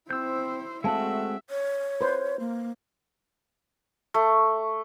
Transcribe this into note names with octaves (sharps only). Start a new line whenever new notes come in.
C4 E4 C5 E6 G6
G#3 A3 C4 F#4 E5 F5 A5
C#5
B4 C5
A#3
A3